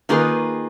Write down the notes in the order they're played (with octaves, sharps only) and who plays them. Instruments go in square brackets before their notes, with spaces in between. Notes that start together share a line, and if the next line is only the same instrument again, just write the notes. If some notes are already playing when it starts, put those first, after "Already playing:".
[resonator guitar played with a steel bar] D#3 A#3 F4 G#4 B4